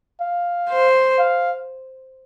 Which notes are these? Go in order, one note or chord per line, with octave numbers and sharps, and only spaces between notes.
F5
C5
F5